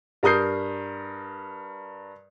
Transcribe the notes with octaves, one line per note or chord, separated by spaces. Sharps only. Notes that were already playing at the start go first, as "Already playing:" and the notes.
G2 A#4 D#6 G6 C7